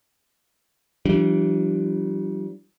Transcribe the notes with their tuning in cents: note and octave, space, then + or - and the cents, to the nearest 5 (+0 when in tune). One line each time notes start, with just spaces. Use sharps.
E3 +40 G3 -35 D4 +0